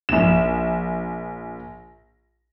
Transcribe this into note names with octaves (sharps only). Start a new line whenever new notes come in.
A#1 E7